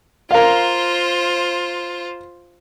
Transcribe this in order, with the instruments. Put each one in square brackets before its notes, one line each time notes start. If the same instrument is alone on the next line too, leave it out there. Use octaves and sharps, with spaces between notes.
[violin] F4 C5 [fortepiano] A#4 F5